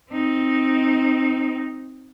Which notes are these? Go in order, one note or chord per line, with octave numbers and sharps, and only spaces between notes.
C4 D#4